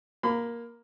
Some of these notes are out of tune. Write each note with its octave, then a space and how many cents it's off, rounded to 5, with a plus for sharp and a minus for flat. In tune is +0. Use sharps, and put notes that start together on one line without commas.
A#3 +10 B5 +35